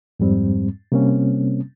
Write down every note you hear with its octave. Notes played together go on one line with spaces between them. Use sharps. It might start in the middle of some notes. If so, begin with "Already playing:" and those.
F2 G#2 G3 C4
C3 G3 A#3 C4 C#4